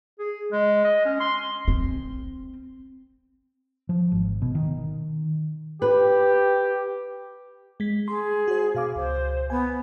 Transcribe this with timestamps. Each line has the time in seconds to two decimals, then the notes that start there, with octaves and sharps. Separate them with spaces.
0.19 G#4
0.52 G#3
0.84 D#5
1.05 C#4
1.20 C6
1.68 C4
3.89 F3
4.12 G#1
4.42 B2
4.55 D#3
5.82 G4 B4
7.80 G#3 B6
8.08 G#4 C6
8.48 F#4 C5
8.75 B2 F5 D6
8.96 C#2 C5
9.50 B3 G#5